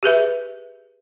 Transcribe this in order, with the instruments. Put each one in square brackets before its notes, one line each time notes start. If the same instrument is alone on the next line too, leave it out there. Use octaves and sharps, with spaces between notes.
[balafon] G4 G#4 B4 E5